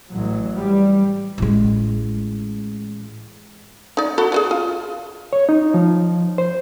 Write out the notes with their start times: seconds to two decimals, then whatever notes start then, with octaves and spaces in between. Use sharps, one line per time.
0.12 A1 F#3
0.58 G3
1.38 A1 G#3
3.97 D#4 D5
4.18 F#4 A4 B5
4.32 G#4 B4 D5
4.51 F4
5.33 C#5
5.49 D#4
5.74 F3
6.38 C5